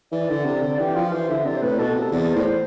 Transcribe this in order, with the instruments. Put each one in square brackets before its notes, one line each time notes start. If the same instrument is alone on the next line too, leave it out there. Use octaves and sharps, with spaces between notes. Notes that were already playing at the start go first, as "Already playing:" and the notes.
[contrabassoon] E3 [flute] D5
[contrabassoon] D3
C3
D3
[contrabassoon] E3 [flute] G4
[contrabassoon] F3 [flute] F4
[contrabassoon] E3 [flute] C5
[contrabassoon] D3 [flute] E5
[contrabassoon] C3 [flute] D5
[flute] C5
[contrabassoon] A2 [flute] B4
[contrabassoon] B2 [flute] A4
[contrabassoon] C3
[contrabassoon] E2 [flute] D5
[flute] D5
[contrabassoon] A2 [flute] C5